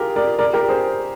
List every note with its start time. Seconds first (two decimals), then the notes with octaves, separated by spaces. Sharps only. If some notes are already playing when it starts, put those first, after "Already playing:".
Already playing: F4 G4 G#4 A#4
0.16 A#4 D5
0.39 A#4 D5
0.53 G4 A#4
0.69 G#4 C5